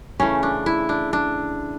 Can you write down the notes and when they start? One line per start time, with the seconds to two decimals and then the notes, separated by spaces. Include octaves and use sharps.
0.20 C#3 E3 A3 C#4
0.43 D4
0.66 E4
0.89 D4
1.13 D4